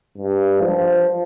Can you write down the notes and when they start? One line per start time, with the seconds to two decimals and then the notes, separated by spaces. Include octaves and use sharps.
0.18 G2
0.62 F3